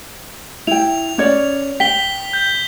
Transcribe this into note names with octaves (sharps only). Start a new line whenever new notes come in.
E4 G5 F7
C#4 C#5 D5
G5 B6 G7
G6